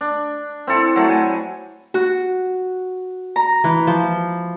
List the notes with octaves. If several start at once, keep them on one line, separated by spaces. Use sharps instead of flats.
D4
C4 E4 A4
F#3 A3
G#5
F#4
A#5
E3
F3